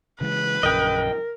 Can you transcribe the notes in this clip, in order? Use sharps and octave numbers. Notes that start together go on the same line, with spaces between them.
C#3 E3 G#3 B4
A#1 F#2 C#3 A#4 D#5 G5